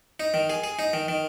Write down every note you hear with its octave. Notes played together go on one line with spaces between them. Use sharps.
D#4
D#3
G#4
G#4
D#4
D#3
D#3